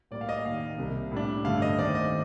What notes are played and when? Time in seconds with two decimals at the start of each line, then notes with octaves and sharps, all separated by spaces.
0.11 A2 G3 A#3 D5
0.21 F5
0.29 D#5
0.45 D#2 D#3 A#3 F5
0.78 C2 C3 G3
1.12 A2 G3 D4
1.44 G2 D3 A3 F5
1.62 D#5
1.78 D#2 D#3 A3 C4 D5
1.95 D#5